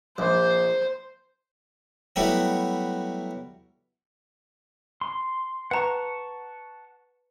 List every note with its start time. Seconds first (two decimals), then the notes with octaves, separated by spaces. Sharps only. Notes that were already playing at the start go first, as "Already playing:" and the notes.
0.18 A#1 C5
2.16 F#3 G3 A3 B3 E4 F#4
5.01 C6
5.71 B4 F#5 A5 A#5 C#6